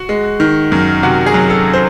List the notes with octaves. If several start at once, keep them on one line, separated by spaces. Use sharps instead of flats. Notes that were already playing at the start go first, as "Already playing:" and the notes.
Already playing: F#4
G#3
D#3
F#2
C3 F#4
G#4
F#3
A4
C5